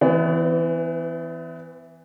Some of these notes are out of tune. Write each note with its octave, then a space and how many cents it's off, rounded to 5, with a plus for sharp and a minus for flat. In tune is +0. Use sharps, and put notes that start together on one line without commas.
E3 +0 B3 +40 D5 -35